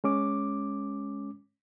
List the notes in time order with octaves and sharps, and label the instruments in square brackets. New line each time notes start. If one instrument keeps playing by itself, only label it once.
[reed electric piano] G#3 C#4 D6